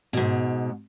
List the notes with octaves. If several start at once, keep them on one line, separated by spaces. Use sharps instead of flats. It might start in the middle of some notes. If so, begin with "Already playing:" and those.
G#2 B2